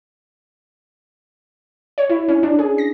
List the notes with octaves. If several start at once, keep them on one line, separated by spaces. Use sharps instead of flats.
C#5
E4
C#4
D4
G#4
A#6